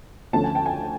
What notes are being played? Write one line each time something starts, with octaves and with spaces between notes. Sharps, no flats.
D2 D3 F3 A3 C#4 A5
G#5
G5
G#5